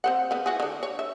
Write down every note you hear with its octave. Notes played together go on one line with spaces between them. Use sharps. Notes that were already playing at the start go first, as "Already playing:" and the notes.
C4 C5 F#5
C#3 B3
E4 F#4 G#4
D3 D4
C#5
E5